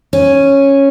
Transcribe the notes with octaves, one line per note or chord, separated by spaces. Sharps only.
C#4